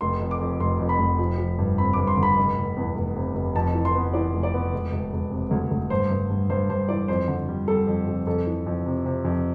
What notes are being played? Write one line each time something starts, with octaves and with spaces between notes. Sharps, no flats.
F1 C6
F2
D6
F2
F1 C6
F2
B5
F1
F3
F3
G2
C4 B5
G2 D6
C6
D3
B5
F1
F1
E2
F1
C3
F1
F2 A5
E3
C6
B3
E3 D5
F1
D5
B3
E1
E1
E1
C3
D2
D2
G2 C5
G2
G2
G2 C5
G2 C5
E3 D5
F2 C5
D3
G3
G3 A4
F2
F2
F2 A4
E3
F2
C3
C3
F2